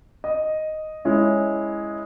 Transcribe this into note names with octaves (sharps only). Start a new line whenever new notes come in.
D#5
G#3 C#4 E4